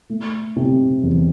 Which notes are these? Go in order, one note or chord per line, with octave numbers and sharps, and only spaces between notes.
A3
C3
E2